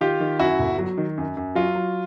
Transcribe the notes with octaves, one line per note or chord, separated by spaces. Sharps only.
D#3 F4 G4
D#3
F#2 E4 F#4
G1
F#3
D#3
F#2
F#2
F#3 F4
F#3